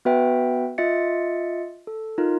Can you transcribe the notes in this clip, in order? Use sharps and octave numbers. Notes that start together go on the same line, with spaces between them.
B3 F#4 B4 E5 G5
F4 D#5 E5 A6 C#7
A4
D#4 F4 A#4